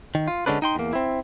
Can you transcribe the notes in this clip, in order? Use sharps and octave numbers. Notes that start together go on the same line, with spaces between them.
D#3
F4
D3 G#3 C#4 D4 B4
D#4 G5 C6
E2 A#3
C4 E4